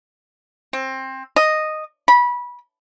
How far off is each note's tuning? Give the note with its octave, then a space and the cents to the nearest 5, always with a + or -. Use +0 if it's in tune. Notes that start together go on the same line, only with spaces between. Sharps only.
C4 +20
D#5 -5
B5 -20